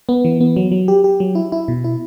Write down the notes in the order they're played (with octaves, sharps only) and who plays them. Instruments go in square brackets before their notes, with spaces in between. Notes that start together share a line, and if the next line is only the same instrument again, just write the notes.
[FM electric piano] B3
E3
B3
F#3
F#3
G4
G4
F#3
E4
E4
B2
E4